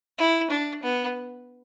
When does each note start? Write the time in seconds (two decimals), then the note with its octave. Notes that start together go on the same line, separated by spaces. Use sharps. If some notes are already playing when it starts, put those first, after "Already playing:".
0.18 E4
0.50 D4
0.83 B3